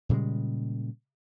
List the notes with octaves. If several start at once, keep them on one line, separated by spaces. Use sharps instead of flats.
A#2 C#3 G3 G#3